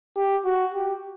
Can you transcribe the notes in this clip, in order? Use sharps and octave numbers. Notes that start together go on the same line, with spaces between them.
G4
F#4
G4